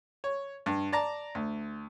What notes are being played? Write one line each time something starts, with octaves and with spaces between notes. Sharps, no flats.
C#5
G2
D5 A5 A#5
D2